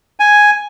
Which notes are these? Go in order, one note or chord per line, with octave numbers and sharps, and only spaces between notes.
G#5